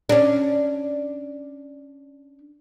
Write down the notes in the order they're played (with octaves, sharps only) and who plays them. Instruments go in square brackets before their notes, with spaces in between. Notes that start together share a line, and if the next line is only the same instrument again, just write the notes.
[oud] C#4 D4